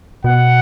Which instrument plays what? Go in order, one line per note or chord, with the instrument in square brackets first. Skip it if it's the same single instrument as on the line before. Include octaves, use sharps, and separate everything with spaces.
[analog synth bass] B2 [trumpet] F#5